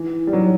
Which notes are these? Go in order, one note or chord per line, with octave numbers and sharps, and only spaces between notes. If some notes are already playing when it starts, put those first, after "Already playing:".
Already playing: E3
G3
F#3